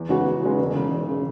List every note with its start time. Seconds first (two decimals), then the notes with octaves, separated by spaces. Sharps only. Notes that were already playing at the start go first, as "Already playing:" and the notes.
Already playing: E2
0.09 C#3 G#3 B3 F#4
0.26 E2
0.42 C#3 G#3 B3 F#4
0.59 E1
0.75 E2 C#3
0.91 E1
1.09 C#3